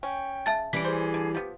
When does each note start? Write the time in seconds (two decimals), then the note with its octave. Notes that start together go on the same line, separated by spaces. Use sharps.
0.03 C#4 G5
0.46 C#3 E5 A5 A6
0.73 E3 G3 C#4 B6 D7
0.85 G#4 C5
1.14 D3
1.35 F3 B3 G4